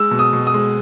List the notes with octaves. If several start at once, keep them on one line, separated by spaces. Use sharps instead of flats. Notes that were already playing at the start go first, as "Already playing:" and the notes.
Already playing: G#3 E6
B2
D#6
B2
D#6
G#3